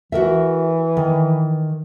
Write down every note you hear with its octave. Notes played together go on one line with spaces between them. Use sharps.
E3 F#4 A#4 E5
D#3